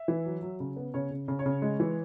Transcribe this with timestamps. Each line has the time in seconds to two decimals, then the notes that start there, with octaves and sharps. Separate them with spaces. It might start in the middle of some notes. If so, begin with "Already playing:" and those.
Already playing: E5
0.08 E3
0.26 F#3
0.42 F#3
0.60 C#3
0.77 B3
0.94 C#3 C#5
1.11 C#3
1.28 C#3
1.39 C#5
1.46 C#3
1.62 G#3
1.80 E3